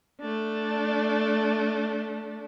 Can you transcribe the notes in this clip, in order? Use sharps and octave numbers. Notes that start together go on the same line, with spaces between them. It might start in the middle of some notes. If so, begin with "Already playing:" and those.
A3 D4